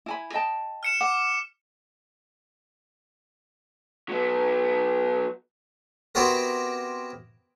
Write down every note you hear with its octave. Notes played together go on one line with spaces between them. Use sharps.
E4 G#5 B5
D#5 G5 A5
F6 C#7 E7
F#5 D6
F#3 B3
B3 C4 E4 F#4 G4 A#4